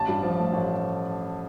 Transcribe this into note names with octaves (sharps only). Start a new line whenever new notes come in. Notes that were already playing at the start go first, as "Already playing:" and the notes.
Already playing: A1 A5
G2
F3
A3
A1